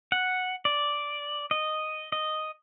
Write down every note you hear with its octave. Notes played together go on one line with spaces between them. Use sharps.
F#5
D5
D#5
D#5